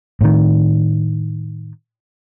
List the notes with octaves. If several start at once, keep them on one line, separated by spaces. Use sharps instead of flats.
A2 D#3